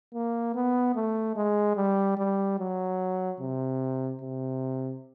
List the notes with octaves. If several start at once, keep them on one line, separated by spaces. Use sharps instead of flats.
A#3
B3
A3
G#3
G3
G3
F#3
C3
C3